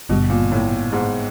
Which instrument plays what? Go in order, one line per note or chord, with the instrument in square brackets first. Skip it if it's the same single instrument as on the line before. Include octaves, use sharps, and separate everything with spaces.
[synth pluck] G#1 G2 D3 G3 [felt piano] B2
[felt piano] A#2
A2
G#2